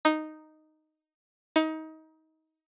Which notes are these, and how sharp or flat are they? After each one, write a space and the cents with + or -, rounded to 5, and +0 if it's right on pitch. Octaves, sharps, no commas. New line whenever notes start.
D#4 -5
D#4 +25